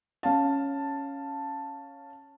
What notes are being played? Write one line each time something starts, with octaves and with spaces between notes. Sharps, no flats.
C#4 F5 A5